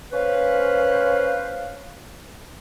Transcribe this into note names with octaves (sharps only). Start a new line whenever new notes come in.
C#4 B4 C5 F5